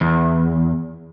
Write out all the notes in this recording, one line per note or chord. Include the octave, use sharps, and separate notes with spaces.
E2